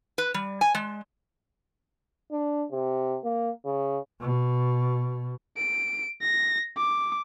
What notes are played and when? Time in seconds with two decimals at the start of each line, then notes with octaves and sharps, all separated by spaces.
0.18 B4
0.34 G3
0.61 G#5
0.75 G#3
2.32 D4
2.72 C3
3.24 A#3
3.65 C#3
4.20 B2
5.57 D7
6.22 A#6
6.77 D6